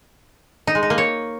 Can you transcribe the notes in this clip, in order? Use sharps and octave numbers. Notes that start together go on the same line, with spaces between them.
D#4
G#3
D#4
A#3
C#5